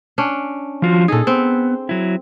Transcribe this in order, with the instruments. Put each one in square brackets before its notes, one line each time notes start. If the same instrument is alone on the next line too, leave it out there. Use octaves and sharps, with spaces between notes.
[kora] C#4 D4
[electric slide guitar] F3 F4 F#4
[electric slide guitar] A#2 D#4 [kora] G#4 A4
[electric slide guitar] B3 [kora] C4
[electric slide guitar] F#3 E4